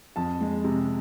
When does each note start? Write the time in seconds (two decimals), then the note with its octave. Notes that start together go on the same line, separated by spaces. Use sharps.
0.16 F2 A5
0.41 G#3
0.64 C3